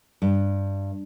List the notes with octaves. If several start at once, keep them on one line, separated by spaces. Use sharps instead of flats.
G2